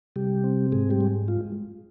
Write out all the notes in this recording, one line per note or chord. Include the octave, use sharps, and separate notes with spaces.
C3 G3 G4
C4
G#2 G#3 G#4
G3 G4
G#3
F4